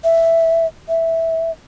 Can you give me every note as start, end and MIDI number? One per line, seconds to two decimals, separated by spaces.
0.04 0.66 76
0.88 1.51 76